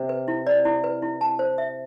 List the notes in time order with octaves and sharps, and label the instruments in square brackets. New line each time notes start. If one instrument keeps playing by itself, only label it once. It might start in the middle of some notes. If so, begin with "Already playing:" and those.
Already playing: [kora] C3
[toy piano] B4
E4
D5
E4
B4
E4
A5
C5
E5